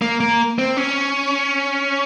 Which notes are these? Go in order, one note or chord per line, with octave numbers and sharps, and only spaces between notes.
A#3
A#3
C4
C#4